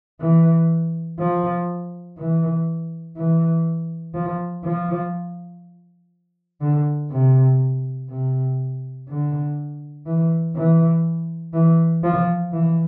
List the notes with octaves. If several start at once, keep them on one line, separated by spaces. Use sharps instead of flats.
E3
F3
E3
E3
F3
F3
D3
C3
C3
D3
E3
E3
E3
F3
E3